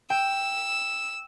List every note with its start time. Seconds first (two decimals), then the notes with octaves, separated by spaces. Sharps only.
0.10 G5 E6